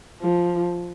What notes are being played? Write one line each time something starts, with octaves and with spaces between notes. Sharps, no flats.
F3